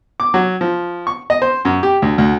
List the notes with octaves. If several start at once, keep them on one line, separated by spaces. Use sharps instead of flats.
D6
F#3
F3
C#6
D#5
C5
F#2
G4
D2
D2